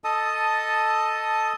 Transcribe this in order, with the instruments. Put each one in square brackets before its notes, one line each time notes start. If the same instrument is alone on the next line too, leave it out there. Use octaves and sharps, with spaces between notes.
[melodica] A4 D#5 A5 D#6